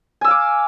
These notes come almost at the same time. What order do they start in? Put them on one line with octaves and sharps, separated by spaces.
G#5 E6 F5 D6